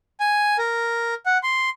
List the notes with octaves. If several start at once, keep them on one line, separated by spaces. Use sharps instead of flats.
G#5
A#4
F#5
C6